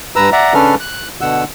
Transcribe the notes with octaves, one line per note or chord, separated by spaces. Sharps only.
G2 B4 A#5 E6
D5 E5 F#5 A#5
C#3 C#4 D4 A4 B4 F6
F#6
B2 D3 F#5 E6